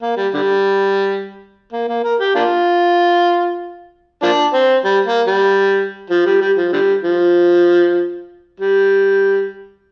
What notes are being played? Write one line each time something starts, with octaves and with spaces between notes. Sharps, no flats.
A#3
G3
D3 G3
A#3
A#3
A#4
G4
A#3 D4 F4
F3 A#3 D4
C4
G3
A#3
G3
F3
G3
G3
F3
D3 G3
F3
G3